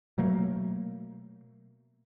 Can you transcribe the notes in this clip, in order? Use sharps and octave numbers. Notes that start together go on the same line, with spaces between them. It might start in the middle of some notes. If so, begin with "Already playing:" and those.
B2 F#3 A3 A#3